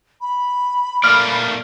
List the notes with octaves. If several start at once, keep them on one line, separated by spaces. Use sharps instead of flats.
B5
A3 A#3 D5 F6